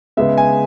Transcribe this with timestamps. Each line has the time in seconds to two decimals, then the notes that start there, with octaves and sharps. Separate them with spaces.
0.17 C#3 G#3 B3 E5
0.38 G#5